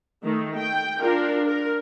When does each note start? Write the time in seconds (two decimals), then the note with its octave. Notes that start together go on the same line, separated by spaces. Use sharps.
0.24 D#3 A3
0.57 G5
1.01 D4 F4 A#4
1.47 A#4